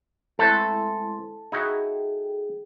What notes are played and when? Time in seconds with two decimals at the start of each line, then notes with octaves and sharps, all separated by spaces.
0.39 G#3 A3 C4 E4 A4 B4 C6
1.52 D#4 E4 F#4 G#4 G5